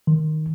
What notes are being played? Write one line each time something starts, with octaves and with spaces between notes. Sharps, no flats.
D#3